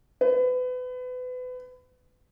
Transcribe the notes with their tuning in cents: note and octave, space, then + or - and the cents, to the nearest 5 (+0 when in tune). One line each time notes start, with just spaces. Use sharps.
B4 +30